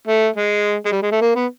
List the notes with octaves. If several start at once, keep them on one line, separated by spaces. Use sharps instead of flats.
A3
G#3
G#3
G3
G#3
A3
A#3
B3